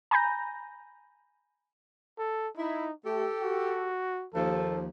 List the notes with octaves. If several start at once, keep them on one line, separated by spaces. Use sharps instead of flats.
G#5 A#5 B5 G6 A#6
A4
D#4 E4
A3 G4 A4
F#4
D#2 F3 A4